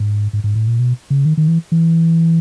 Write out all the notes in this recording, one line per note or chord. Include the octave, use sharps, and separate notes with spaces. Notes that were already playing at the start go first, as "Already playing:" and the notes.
Already playing: G#2
G#2
G#2
A2
A#2
B2
C#3
D#3
D#3
E3
E3